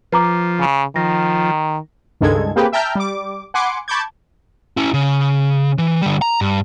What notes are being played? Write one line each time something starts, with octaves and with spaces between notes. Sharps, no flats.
F3 B4 A#5 D6
C#3
D#3 F3 A#6
C#2 G2 D#3 G#3 A4 G#6
A#3 C4 G4 G#4 B4
E5 G5 A5 A#5 F6 G6
G3 D6
F#5 G#5 B5 C6 D6 C#7
A5 B5 C#6 D6 G6 G#6
C#4 E4
C#3
E3
D3 G3
A#5
G2